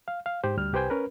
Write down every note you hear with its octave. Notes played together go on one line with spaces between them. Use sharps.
F5
F5
G#2 G4 C5
D2 G3 F6
C2 G4 B4 C5 G5 G#5
C#4 A#4 B4